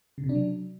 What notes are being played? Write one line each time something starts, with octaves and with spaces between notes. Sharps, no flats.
C#3
C3
D4
F#3